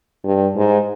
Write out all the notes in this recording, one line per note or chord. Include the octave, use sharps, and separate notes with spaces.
G2
G#2